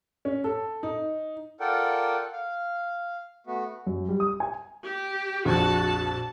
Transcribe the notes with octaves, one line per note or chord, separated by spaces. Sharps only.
C#4
A4
D#4
F4 A4 A#4 D5 F#5 G5
F5
A3 B3 F#4
F#2
G3
D#6
G#5
G4
A#1 F2 F#4 A5